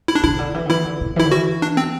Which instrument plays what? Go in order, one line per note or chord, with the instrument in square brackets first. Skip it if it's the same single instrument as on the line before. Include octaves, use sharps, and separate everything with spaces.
[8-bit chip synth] E4
D4
[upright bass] D3 [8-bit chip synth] E4
[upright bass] C3
D3
E3
D3
[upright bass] E3 [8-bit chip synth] E4
[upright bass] D3
C3
[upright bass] E3 [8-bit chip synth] E4
[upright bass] D3
[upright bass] E3 [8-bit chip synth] F#4
[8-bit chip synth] D4
C4